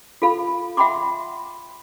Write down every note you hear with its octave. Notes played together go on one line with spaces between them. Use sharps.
F4 A4 F5 B5
E5 F#5 G5 B5 C6 D6